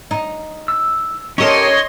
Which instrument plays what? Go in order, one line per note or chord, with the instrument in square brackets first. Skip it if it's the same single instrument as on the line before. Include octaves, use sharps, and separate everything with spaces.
[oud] D#4
[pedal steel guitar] E6
[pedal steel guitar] C#4 G4 A#4 [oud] D#4 A4 [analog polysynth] C#5 D#5 C6